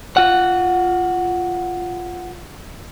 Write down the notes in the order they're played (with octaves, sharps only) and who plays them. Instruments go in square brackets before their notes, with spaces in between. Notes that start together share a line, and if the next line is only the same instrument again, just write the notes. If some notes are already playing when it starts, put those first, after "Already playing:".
[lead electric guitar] F4 F#5